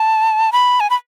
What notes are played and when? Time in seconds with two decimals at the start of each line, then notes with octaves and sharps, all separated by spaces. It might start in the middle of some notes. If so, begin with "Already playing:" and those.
Already playing: A5
0.52 B5
0.80 G#5
0.90 B5